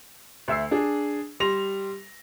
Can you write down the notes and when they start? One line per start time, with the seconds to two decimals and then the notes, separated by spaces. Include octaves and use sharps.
0.48 D2 E5 E6 C7
0.71 D4 G#4
1.40 G3 C6 A#6 F7